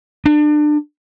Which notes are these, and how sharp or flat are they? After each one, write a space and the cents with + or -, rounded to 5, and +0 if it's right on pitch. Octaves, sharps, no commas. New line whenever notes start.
D4 +30